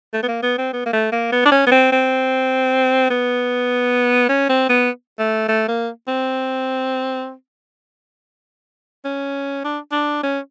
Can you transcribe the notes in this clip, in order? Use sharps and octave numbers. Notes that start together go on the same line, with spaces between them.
A3
B3
A#3
B3
C4
B3
A#3
A3
A#3
B3
D4
C#4
B3
C4
C4
B3
C#4
C4
B3
A3
A3
A#3
C4
C#4
D4
D4
C#4